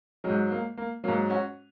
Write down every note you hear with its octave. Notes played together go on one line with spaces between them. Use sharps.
F#3 G#3
G#2
A#3
A#3
G#2 F#3 A#3
C#4 F#4